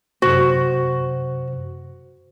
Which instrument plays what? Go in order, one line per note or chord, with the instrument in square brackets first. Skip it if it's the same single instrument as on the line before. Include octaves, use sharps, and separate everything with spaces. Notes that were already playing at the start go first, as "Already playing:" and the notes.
[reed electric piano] F#2 C3 C5 [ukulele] F#4